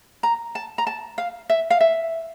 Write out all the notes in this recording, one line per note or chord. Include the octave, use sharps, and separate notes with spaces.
A#5
A5
A#5
A5
F5
E5
F5
E5